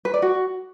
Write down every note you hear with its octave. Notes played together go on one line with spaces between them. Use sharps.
B4
D5
F#4